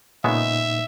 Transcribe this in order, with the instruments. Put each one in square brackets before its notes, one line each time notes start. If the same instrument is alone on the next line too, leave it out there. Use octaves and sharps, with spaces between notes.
[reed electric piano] A#2 D#4 [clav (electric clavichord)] C#3 G#3 B3 [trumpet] E5